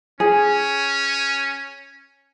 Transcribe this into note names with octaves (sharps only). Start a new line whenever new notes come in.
C#4 G#4